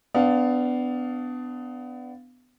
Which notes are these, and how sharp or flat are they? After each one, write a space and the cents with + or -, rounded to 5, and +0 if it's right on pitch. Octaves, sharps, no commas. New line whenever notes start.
B3 +25 D4 +0 F5 +0